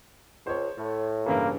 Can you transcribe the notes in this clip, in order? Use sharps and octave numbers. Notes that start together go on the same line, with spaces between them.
C#2 C5 C#5
A2
G2 C#3 E3 A#3